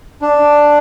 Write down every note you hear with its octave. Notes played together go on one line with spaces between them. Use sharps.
D4